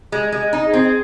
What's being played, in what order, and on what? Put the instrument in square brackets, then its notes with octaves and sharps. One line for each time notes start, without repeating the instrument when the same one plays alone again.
[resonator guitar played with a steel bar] G#3 [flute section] G#5
[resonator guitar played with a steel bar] G#3
[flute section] D#5
[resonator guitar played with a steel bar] D#4
[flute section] G#4
[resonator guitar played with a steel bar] C4